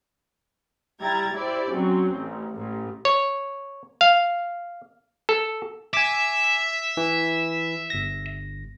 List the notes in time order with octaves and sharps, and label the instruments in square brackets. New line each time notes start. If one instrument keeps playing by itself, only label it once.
[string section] G3 E4 G5 A#5 G#6 A6
E4 G4 C5 D5
F#3 C4 C#4
A1
A1 A2
[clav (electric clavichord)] C#5
F5
A4
[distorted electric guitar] E5 [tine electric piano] G#5 D6
[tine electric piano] E3
G1 A#6